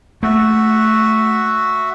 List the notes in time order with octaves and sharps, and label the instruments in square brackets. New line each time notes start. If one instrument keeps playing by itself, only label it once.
[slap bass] A3 [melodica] F#4 E5